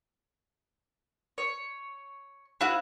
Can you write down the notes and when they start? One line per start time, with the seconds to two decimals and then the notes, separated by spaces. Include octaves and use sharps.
1.38 C#5
2.61 E4 F#4 F5